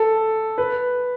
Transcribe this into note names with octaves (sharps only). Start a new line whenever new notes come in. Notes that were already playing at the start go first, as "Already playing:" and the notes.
Already playing: A4
B4